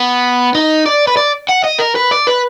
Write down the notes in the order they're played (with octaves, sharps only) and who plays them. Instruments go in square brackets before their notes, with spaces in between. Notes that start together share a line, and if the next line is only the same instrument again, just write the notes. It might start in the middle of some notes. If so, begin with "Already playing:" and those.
Already playing: [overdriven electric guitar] B3
D#4
D5
B4
D5
F#5
D#5
A#4
B4
D5
B4